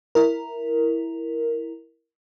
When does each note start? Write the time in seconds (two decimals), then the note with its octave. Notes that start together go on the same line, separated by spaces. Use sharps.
0.15 E4 A#4